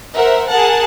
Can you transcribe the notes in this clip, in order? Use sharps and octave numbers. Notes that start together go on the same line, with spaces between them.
A#4 C5 E5 F#5
G#4 A#4 F#5 A5